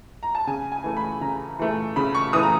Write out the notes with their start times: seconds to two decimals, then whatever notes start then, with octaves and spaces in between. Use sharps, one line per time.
0.23 A#5
0.35 A5
0.47 C#3 G#5
0.72 G#5
0.84 E3 A3
0.97 B5
1.21 C#3 A#5
1.59 E3 A3
1.96 C#3 B5
2.15 C#6
2.33 E3 A3 D#6
2.43 A#5